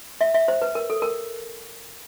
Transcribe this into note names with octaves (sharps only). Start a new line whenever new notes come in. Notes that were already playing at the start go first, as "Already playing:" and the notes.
E5
E5
C5
B4
A#4
A4
A#4